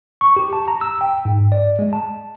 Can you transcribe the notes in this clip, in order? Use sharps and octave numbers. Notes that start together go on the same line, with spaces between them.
C#6
G4
A5
A#5
E6
G5
G#2
D5
G#3
A5